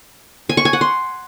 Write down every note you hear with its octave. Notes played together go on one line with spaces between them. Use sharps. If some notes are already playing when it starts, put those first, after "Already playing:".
G#5
C#6
G#5
F#5
C6